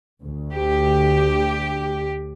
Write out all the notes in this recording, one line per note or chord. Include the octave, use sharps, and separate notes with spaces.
D2
G4